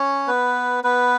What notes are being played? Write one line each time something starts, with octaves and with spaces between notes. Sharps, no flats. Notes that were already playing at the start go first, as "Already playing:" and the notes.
Already playing: C#4 C#5
B3 B4
B3 B4